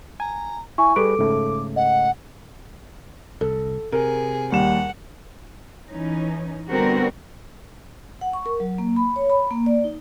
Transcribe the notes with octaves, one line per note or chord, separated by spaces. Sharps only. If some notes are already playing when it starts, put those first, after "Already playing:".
G#5 A#5
E4 G#5 C#6
G3 G#4 A4 B4 D6 D7
G#2 C#3 A3
D#5 F#5
C2 A4
C3 G#4 A#4
D#2 G3 F#5 E7
E3 C#4 D#4
D3 G3 B3 C4 F#4 A#4
F#5
C#6
A#4
F#3
A#3
B5
C#5
B5
A#3
D5
D#4